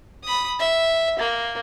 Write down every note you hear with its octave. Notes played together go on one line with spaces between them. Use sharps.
B5 D#6
E5
A#3